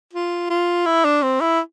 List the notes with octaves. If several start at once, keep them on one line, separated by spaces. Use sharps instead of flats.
F4
F4
E4
D4
C4
E4